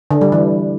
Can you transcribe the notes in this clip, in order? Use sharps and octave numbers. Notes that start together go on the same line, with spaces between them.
D3
G3
E3